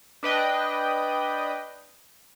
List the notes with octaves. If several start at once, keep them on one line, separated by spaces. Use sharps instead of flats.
D4 B4 D#5 G5